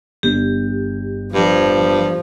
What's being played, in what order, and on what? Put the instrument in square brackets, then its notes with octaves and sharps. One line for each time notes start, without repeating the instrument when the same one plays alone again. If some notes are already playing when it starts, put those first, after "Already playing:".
[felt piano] G1 [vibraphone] G4
[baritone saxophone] G2 [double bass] F3